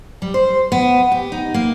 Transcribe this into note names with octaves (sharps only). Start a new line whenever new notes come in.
G3
C5
B3
G4
D#4
A#3